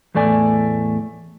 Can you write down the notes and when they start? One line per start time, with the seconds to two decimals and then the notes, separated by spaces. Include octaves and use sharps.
0.15 E2 A2 A3 D5 G#5